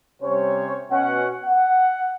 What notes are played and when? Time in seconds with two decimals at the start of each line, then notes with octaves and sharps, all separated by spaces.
0.22 C3 G3 C#4 C5 C#5
0.92 B2 C#4 F#5
1.44 F#5